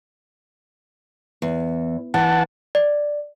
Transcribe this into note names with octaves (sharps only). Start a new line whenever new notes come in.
E2
E3 F#5 A5
D5